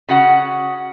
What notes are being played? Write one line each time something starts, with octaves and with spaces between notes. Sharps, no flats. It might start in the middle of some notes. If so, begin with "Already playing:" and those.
C#3 F#4 F#5